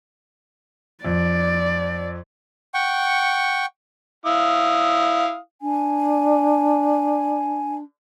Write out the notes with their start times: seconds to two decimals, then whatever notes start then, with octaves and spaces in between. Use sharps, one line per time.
1.05 F2 D5
2.74 F#5 G5 C#6
4.26 E4 F5 D#6
5.61 D4 G#5